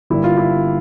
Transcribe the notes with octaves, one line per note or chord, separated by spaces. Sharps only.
G1 G2 G3 A#3 E4
F4
E4